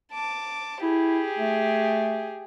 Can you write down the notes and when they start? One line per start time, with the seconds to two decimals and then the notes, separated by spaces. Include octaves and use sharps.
0.13 A5 D6
0.82 E4 G4 G#4
1.39 A3